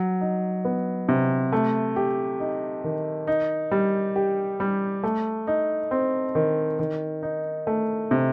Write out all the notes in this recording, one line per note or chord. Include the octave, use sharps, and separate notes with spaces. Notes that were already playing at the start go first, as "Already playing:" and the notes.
Already playing: F#3
D#4
B3
C3
A3
G4
D#4
D#3
D#4
G3
G4
G3
A3
D#4
C4
D#3
D#3
D#4
A3
C3